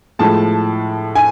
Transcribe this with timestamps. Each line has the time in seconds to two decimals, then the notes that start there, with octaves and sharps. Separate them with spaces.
0.19 A2 F3 G#3 A5
1.15 G#5